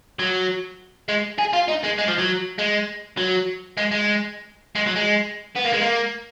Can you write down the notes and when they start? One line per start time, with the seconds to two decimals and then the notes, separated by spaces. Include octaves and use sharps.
0.19 F#3
1.09 G#3
1.39 G#4
1.54 F4
1.68 D#4
1.84 G#3
1.98 G#3
2.08 F3
2.18 F#3
2.58 G#3
3.17 F#3
3.77 G#3
3.91 G#3
4.75 G#3
4.87 F#3
4.96 G#3
5.55 B3
5.64 A#3
5.73 G#3
5.81 A#3